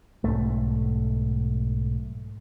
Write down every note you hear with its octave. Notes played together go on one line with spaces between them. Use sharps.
B1 E2 G#2 A3